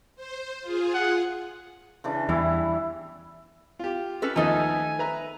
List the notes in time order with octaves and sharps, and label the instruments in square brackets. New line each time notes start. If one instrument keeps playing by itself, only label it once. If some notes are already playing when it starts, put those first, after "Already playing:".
[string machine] C5
F4 G#4
[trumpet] F#5
[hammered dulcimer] C#3 E3 D4
[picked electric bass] E2 [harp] E3 [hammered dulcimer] G3 E4
[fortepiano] F4 G4
[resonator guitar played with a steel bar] C#4 A4 B4
[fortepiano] D#2 F3 B3 [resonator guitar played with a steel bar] A3 D#4 A4 [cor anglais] G#5
[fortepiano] B4 E5 A#5